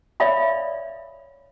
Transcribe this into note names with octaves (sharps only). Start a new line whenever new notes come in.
C#5 D5 E5 F5 B5